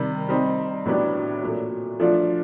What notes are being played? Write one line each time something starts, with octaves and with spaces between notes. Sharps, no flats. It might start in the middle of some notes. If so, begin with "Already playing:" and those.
Already playing: C3 D#3 G3
G3 C4 D#4
A2 F#3 B3 D4 G4
A#2 F#3 A3
F3 A3 D4 F4